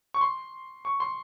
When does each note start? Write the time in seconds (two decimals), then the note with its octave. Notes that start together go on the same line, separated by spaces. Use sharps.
0.14 C#6
0.21 C6
0.85 C#6
1.00 C6